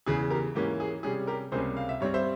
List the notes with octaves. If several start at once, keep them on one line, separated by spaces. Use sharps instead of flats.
E2 C#3 E3 G#4
G4 A#4
G#2 E3 A#3 C#4 G4
G#4
C3 G3 C#4 G#4
G4 A#4
C#2 C3 G3 A#3 C#4 G#4 C5
F5
E5
G2 G3 C4 C#5
C5 E5